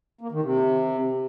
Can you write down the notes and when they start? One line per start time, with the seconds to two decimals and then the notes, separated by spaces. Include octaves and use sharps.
0.21 A#3
0.32 D#3
0.42 C3